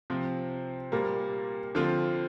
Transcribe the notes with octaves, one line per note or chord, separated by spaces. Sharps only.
C3 F3 C4
A#2 G3 A#3
D3 F3 C4 F4